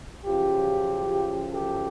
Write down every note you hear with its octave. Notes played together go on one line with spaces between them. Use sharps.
F#2 C#3 F3 F4 G4
G4 A4